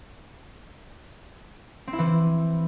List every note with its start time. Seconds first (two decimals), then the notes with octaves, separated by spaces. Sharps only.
1.87 C4
1.93 E4
1.99 E3